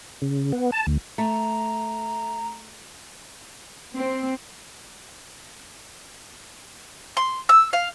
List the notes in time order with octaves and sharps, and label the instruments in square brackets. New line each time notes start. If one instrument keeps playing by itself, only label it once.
[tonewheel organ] C#3
B3
A5
D2
[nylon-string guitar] A3 [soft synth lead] A#5
[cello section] C4
[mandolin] C6
E6
F5